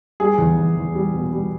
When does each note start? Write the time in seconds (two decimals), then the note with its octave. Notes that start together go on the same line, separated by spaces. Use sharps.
0.20 G3 G#4
0.38 E2
0.57 E2
0.76 E2
0.95 G3
1.14 B2
1.32 G3